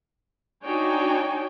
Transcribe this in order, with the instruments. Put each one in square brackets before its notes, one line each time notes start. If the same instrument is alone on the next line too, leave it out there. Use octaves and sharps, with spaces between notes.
[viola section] D4 D#4 F#4 C#5 G5 G#5